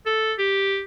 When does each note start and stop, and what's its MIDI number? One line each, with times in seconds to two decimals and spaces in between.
0.06 0.34 69
0.39 0.83 67